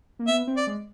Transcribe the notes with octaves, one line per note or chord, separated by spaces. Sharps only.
A#3
B3 E5
C4
D5
G#3